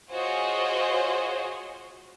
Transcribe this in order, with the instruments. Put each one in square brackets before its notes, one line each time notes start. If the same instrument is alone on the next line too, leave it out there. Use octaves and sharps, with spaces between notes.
[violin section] F4 F#4 G#4 C5 C#5 D#5